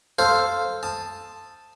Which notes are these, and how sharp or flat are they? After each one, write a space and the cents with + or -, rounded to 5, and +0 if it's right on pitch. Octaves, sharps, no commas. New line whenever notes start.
A4 +0 C5 +0 F5 +0
A5 +0 D#6 -15